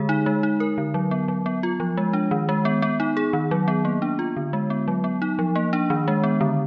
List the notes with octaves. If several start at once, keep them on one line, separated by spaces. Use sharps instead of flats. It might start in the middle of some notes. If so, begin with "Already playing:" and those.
Already playing: D3 G#3 G#4
D#4
G#3
D#4
A#4
D3
F#3
B3
F#3
B3
F4
F3
G#3
D4
D#3
G#3
B3
B3
D#4
G#4
D#3
F#3
B3
A#3
D4
F4
D3
G#3
B3
F#3
B3
D#4
F3
A#3
D4
D#3
G#3
B3
D3